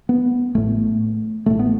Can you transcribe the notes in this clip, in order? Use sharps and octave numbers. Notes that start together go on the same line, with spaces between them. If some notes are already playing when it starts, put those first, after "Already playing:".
B3
A1 A2 A3
A1 A2 A3
B3